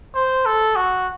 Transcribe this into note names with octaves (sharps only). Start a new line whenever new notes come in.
C5
A4
F#4